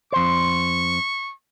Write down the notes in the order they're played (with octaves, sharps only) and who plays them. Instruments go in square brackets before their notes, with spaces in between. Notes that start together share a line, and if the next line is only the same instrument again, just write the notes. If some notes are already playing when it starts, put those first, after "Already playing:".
[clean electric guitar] F2 C5 [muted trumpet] C#6